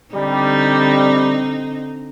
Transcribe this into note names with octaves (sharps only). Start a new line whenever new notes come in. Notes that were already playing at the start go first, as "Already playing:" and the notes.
D3 G3 C4 D#4